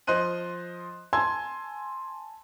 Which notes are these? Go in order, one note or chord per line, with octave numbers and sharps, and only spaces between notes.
F3 C5 D#5 C6 F#6 D#7
G#5 A5 C6 E6 G#6